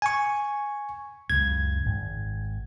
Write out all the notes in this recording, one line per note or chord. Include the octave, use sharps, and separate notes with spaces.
G#5 C#6
C#2 F#2 G#6
G#1 G#2